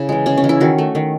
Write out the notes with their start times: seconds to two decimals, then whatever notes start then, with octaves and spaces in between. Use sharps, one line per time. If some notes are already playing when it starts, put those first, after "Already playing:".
Already playing: C#3 E4
0.09 E3 G#3
0.26 C#3 C#4
0.37 C#4
0.44 E3 G#3
0.49 E4
0.60 D#3 F#4
0.78 A3
0.95 D#3